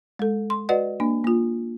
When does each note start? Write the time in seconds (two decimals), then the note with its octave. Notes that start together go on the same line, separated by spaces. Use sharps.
0.19 G#3 A4
0.50 C6
0.69 F#4 B4 D5 D#5 F#5
1.00 A#3 D4
1.24 A#3 F4